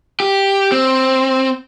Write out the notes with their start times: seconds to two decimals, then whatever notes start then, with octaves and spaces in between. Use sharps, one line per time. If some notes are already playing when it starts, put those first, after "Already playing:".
0.20 G4
0.72 C4